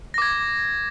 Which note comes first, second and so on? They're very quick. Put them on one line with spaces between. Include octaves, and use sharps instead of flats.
A#6 D6 G#6